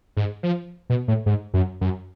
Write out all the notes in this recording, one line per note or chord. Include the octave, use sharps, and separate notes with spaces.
G#2
F3
B2
A2
G#2
F#2
F#2